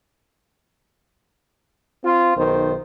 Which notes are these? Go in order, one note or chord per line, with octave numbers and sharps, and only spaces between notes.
C4 F4
B1 D#3 C5